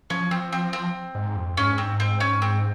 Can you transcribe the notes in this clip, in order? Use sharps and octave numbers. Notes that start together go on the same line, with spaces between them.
F3 C#4
F3 C4
C4
C4
G#2
F2
G#2 C#4
C4
C4
C#4
C4